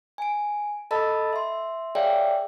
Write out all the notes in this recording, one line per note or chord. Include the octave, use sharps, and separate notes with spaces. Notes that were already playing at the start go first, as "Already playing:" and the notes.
G#5 D7
A4 D#5 A5 B5 E6 A6
E5 C6
G#4 C#5 D5 E5 F5 G5